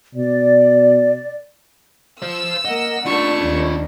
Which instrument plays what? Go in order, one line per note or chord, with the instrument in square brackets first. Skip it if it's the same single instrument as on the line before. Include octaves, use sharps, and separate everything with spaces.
[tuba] B2 [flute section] D5
[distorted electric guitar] C5 F5 [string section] E6
[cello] A#3 F#5 [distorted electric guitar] D#5
[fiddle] A3 C#6 [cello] D4 [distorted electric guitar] D#4 F4
[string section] D#2